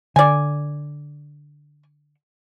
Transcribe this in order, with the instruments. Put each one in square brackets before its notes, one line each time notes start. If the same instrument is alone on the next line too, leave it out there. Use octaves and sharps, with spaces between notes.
[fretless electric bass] D3 [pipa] D5 G#5